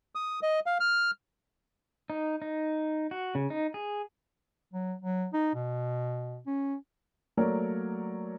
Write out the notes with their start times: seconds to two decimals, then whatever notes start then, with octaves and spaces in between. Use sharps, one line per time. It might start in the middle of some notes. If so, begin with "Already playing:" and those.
0.15 D#6
0.43 D#5
0.66 F5
0.80 F6
2.10 D#4
2.42 D#4
3.11 F#4
3.35 C#3
3.50 D#4
3.74 G#4
4.73 F#3
5.02 F#3
5.33 D#4
5.54 B2
6.46 C#4
7.37 F#3 A3 A#3 A#4 C#5 D5